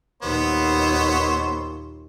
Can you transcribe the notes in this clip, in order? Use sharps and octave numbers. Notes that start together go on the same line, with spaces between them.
D#2 A#2 B3 C5 C#5